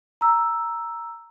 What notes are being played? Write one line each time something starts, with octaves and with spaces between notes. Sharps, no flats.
A#5 E6